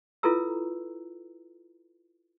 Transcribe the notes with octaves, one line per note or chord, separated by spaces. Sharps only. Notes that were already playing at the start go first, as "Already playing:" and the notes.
E4 F4 A4 B4 A#5 E6